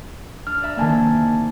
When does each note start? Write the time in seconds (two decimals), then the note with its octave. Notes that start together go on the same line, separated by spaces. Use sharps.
0.47 D4 F6
0.62 D5 E5 A#5
0.77 C2 D#3 A#3 G#5 A5